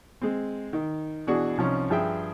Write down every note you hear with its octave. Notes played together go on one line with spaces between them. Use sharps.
G#3 C4
D#3
B2 E3 D4 F#4 G#4
C2 F3 C#4 D#4
G2 F3 G#4 E5 G5